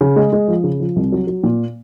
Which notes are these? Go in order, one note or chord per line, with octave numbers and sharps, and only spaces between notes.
C#3
G#3
G#3
F3
C#3
F3
C2
F#3
F#3
A#2